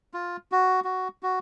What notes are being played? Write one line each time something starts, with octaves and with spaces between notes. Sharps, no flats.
F4
F#4
F#4
F#4